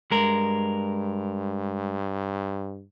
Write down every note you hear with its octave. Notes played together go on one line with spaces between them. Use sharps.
G2 G#3 A#4